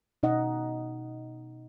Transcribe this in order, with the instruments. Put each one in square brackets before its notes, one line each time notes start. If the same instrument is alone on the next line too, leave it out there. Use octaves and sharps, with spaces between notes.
[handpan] B2 D#4 D#5 F#5